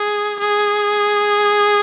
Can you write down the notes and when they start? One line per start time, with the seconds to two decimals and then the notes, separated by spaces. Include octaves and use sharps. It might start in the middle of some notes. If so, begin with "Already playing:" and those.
Already playing: G#4
0.39 G#4